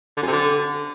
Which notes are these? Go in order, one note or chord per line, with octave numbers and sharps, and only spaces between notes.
D3
F#2
C3
D3